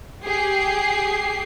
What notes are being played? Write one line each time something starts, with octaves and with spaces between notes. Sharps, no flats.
G4 G#4 C7